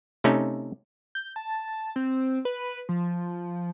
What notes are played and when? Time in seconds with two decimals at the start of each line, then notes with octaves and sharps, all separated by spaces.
0.24 C3 A3 C#4 D#4
1.15 G6
1.36 A5
1.96 C4
2.45 B4
2.89 F3